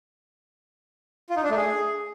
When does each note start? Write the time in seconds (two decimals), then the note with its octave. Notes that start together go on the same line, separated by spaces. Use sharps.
1.30 F4
1.36 D#4
1.43 D4
1.50 A3
1.57 G#4